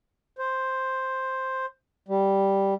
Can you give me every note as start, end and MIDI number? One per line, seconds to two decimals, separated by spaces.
0.39 1.66 72
2.08 2.74 55